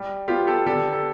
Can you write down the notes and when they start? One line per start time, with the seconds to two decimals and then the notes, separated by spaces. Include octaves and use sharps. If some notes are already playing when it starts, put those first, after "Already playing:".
Already playing: G3
0.28 B3 F4 G4
0.47 G4 A4
0.66 D3 G4 A4
0.93 A4